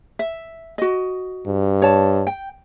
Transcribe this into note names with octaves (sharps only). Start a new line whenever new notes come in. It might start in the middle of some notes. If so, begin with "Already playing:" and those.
E5
F#4 D#5
G2
C#5 A5
G5